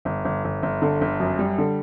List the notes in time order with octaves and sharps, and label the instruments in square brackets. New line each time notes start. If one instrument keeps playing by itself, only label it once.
[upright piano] G1
G1
G1
G1
D3
G1
F#2
G3
D3